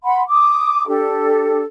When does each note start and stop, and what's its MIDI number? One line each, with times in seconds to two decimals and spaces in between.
0.03 0.23 78
0.03 0.23 83
0.03 0.23 84
0.29 0.85 86
0.29 0.85 87
0.88 1.63 62
0.88 1.63 67
0.88 1.63 69